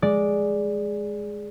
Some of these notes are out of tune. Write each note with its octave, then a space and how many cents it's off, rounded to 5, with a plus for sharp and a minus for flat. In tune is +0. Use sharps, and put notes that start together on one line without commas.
G#3 +0 D5 +0